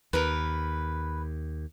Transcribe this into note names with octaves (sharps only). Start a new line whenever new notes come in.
D#2 A#4 B4